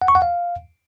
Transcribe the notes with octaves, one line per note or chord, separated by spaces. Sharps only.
F#5
C#6
F#5
F5